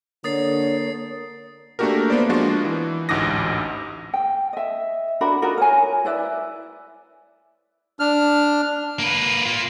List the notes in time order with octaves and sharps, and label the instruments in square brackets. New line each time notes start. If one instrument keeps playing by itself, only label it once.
[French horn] D3 [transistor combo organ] A#3 A#4 [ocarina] C#5 [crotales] D#6 A6 C7
[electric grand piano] A3 A#3 D4 F#4 G4 A#4
A#3 B3 C5 D5
F3 G#3 D4 F4 F#4
E3
A1 D2 G#2 D6 D#6 A#6
[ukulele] G5
D#5 E5
D4 F#4 A#4 B5
D#4 F4 F#4 A#4
A#4 C#5 G#5
E4 B4 D5 E5
[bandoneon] D4 F6
[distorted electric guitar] A#3 B4
A#3 F4